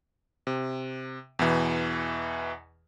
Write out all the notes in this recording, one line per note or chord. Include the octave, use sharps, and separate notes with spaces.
C3
E2 B2 E3